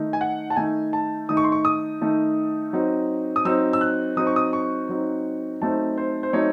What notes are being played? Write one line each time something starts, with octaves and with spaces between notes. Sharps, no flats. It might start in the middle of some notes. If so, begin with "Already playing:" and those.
Already playing: D#3 A3 D#4
G#5
F#5
A5
D#3 A3 D#4 G#5
A5
D#3 A3 D#4 D#6
C#6
C6
C#6
D#6
D#3 A3 D#4
F#3 C4 D#4
D#6
F#3 C4 D#4 E6
E6
F#6
F#3 C4 D#4 D#6
C#6
D#6
C#6
F#3 C4 D#4
F#3 A3 C4 D#4 A5
C5
C5
F#3 A3 C4 D#4 C#5